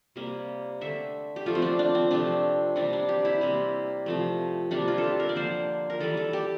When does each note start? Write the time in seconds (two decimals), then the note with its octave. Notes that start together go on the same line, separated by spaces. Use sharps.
0.16 C3 G3 A#3
0.81 D3 A3 E5
1.36 G4
1.46 D3 F3 A3 F4
1.55 C4
1.62 D4
1.79 D4
1.95 C4
2.11 C3 F3 A3 D4
2.76 C3 E3 G3 A#3 D4
2.93 D4
3.09 G4
3.25 E4
3.41 C3 G3 A#3 C4
4.06 C3 F3 A3
4.71 C3 G3 A#3 D4
4.88 F4
4.98 A4
5.04 G4
5.20 A#4
5.29 D5
5.36 D3 F3 A#3 C5
5.90 A#4
6.00 E3 G3 A#3 A4
6.17 A4
6.33 G4